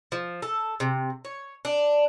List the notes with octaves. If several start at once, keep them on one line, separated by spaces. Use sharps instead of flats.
F3
A4
C3
C#5
D4